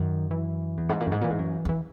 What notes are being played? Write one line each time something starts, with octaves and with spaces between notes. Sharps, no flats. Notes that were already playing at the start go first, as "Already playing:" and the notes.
Already playing: F#2 D#3
E3
E2
G#2
A#2
F#2
G#2
A#2 E3
G#2
F#2
E2
E3